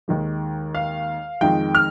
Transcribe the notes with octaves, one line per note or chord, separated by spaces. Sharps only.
D#2 D#3 G#3
F5
F2 D#3 G#3 G5
F6